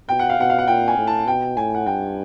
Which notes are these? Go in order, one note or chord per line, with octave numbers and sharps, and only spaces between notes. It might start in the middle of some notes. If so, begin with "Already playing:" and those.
B2 G5
F#5
F5
B2 F#5
F5
F#5
A#2 G5
G#5
A2
A5
B2 G5
A2 G#5
F#5
G2 G5